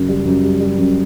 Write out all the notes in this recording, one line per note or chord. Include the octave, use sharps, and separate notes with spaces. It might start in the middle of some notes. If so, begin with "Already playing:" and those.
Already playing: F#2 C#3
G3
F#2
G3
G3
F#2